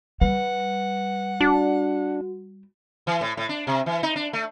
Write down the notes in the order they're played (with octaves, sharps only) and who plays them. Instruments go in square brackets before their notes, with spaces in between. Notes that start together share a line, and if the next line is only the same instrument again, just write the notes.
[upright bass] G3 [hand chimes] B4 [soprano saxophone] F#5
[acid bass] D4 [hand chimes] F#4
[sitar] E3
A2
A2
D4
C3
E3
D#4
D4
A3